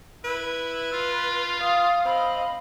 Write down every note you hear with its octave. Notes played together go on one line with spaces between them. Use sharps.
E4 B4
F4
F5 D#6
C4 D#5 F5 B5